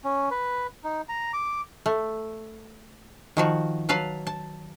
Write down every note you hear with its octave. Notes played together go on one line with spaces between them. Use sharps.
C#4
B4
D#4
A#5
D6
A3
D#3 F3 F#4
F#3 B4 F5 A5
A5